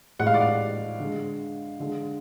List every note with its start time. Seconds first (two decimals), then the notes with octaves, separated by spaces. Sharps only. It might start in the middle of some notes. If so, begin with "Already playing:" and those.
0.19 A2 G#3 F#5
0.27 F5
0.34 D5
0.41 F5
1.00 D3 G#3
1.80 D3 G#3